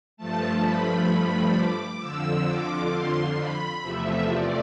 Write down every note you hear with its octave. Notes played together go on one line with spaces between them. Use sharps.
G2 F3 A3 A5
B5
D6
F2 D3 F3 E6
D6
C6
B5
E2 C3 F3 A3 E5
D5